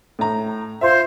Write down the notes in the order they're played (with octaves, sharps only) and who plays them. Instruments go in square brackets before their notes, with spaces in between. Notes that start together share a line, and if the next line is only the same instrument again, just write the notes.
[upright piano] A2 A#5
[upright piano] F4 E5 [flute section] C5